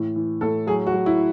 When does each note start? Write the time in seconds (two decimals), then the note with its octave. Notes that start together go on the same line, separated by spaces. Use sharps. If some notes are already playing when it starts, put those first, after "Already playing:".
Already playing: A2 E3
0.16 E3
0.41 A2 A4
0.67 F#3 G#4
0.87 F#4
0.93 F#3
1.06 E4